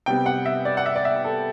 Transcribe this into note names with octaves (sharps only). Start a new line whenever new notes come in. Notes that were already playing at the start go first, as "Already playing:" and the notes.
C3 G3 B3 G5
F#5
E5
D5
F#5
E5
D5
E5
A4